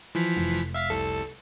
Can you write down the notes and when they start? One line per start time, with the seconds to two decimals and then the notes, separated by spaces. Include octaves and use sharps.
0.15 E3 F3 B6
0.36 F1
0.74 E5 F5 B6
0.90 C2 A4